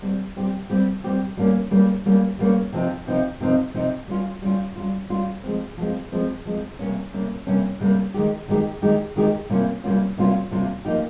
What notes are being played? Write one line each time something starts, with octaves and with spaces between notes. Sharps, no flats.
G3 C4 G4
G3 C4 G4
G3 C4 G4
G3 C4 G4
G3 A#3 C#4
G3 A#3 C#4
G3 A#3 C#4
G3 A#3 C#4
C3 F3 C4 D#4
C3 F3 C4 D#4
C3 F3 C4 D#4
C3 F3 C4 D#4
G3 C#4 F4
G3 C#4 F4
G3 C#4 F4
G3 C#4 F4
F3 G#3 C4
F3 G#3 C4
F3 G#3 C4
F3 G#3 C4
C3 G3 A#3 C#4
C3 G3 A#3 C#4
C3 G3 A#3 C#4
C3 G3 A#3 C#4
D#3 G#3 D#4 G4
D#3 G#3 D#4 G4
D#3 G#3 D#4 G4
D#3 G#3 D#4 G4
C3 G3 A#3 C#4 F4
C3 G3 A#3 C#4 F4
C3 G3 A#3 C#4 F4
C3 G3 A#3 C#4 F4
F3 A#3 D#4 G4